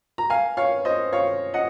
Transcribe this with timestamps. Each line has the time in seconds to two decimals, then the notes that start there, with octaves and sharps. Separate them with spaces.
0.18 A#5
0.30 F5 G#5
0.57 C#5 F5
0.85 C5 D#5
1.13 C#5 F5
1.54 D#5 F#5